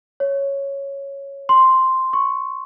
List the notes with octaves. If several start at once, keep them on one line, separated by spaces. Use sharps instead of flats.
C#5
C6
C#6